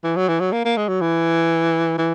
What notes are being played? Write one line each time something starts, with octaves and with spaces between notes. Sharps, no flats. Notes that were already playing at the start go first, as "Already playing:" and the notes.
E3
F#3
E3
F#3
A#3
A#3
G#3
F#3
E3
E3